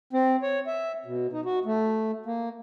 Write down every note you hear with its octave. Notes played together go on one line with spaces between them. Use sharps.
C4
C#5
E5
B2
D#4
F#4
A3
A#3